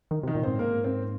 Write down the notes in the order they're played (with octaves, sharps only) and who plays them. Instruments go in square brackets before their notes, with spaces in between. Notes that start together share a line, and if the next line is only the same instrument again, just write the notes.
[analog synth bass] D#3
C3
[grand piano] D#3 D#4
[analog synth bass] A#2
[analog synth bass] G#2 [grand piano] C4 C5
[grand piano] A#3 A#4
C4 C5